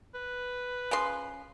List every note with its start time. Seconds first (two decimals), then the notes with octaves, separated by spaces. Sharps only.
0.15 B4
0.91 C#3 F3 C6